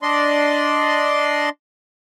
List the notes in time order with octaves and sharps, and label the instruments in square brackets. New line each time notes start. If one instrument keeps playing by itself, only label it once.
[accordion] D4 D5 D#5 C6